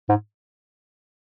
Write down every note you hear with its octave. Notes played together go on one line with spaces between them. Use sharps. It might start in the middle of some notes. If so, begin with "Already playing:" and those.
G#2